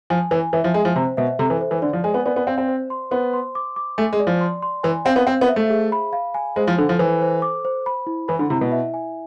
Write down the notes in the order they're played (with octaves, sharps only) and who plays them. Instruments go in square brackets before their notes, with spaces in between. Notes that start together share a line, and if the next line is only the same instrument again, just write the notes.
[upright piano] F3 [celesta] G#5
[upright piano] E3 [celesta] G#5
[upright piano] E3 [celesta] E5
[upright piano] F3
[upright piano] G#3 [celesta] G#5
[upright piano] F3
[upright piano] C3 [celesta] C5
[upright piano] B2 [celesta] E5
[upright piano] C3 [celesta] A4
[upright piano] E3
[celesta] C5
[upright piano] E3
[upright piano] D3 [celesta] D5
[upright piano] F3
[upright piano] G#3 [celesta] G#5
[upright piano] B3
[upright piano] B3 [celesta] D5
[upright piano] B3
[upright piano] C4 [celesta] F5
[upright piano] C4
[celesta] C5
C6
[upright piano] B3 [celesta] C5
[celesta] C6
D6
D6
[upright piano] A3 [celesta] G#5
[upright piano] G#3
[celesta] D5
[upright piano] F3
[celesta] C6
C6
[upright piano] E3 [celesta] G#5
[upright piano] C4 [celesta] F5
[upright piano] B3
[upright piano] C4 [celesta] C5
[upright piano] B3
[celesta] E5
[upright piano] A3
[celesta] G#4
B5
F5
G#5
[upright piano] G#3 [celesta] C5
[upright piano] F3
[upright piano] D3 [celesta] A4
[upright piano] F3
[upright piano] E3 [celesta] C5
[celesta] C5
D6
C5
B5
E4
[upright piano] E3 [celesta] B5
[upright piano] D3
[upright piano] C3 [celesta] E4
[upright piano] B2
[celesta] E5
G#5